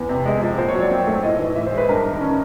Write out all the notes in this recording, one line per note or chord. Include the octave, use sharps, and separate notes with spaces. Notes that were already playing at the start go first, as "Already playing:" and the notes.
Already playing: E2 B3
C3
G#3
F3
A#2 C5
C#5
F#3
D5
C4
A3
A2 D#5
E3
A2 E5
C5
G#3
B4
G2 A#4
D#3
C#4